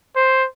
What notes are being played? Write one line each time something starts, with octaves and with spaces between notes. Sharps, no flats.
C5